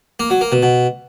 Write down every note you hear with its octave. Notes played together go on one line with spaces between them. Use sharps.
A#3
F#3
A#3
B2
B2